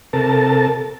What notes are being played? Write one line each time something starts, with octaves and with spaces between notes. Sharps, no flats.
C3 A4 A#4 A5